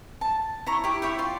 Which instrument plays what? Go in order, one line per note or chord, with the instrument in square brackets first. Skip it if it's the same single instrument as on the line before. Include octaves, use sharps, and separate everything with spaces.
[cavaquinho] A5
E4 C#5 A#5 C#6
E4 G4
E4 C#5 E5 G5
F4 D5 C6